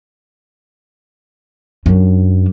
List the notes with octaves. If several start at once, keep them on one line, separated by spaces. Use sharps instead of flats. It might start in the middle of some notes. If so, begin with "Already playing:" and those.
F#2 D4